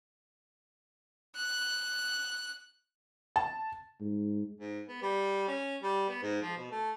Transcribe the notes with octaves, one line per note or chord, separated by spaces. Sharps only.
F#6
A5
G#2
G#2
B3
G3
C#4
G3
B3
G#2
F3
B2
A3